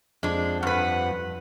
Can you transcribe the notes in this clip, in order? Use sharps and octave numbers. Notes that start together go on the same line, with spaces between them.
F2 G#3 D4
G2 B4 F#5